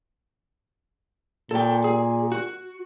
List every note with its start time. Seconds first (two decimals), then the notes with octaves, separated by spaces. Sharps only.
1.51 A#2 A4 G5
1.84 G#4
2.32 F#4